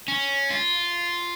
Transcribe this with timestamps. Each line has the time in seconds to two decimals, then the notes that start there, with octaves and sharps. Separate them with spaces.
0.08 C#4
0.50 F4